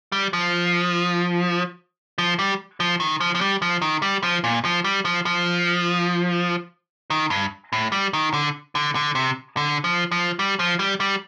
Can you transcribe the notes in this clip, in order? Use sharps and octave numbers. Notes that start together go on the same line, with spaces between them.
G3
F3
F3
G3
F3
D#3
F3
F3
G3
F3
D#3
G3
F3
A#2
F3
G3
F3
F3
D#3
G2
A2
G3
D#3
D3
D3
D3
C3
D3
F3
F3
G3
F3
G3
G3